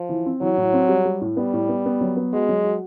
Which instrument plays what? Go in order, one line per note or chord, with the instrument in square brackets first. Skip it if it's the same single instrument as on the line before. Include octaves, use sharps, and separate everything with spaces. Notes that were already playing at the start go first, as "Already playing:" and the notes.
Already playing: [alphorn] F3
[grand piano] E3
C4
[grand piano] E3 [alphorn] F#3
[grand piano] A2
C4
G3
G3
A2
[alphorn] G3 [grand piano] B3
[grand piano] A2
B3
B3
F#3
B3
[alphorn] G#3 [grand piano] F#4
[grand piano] F#3
F#4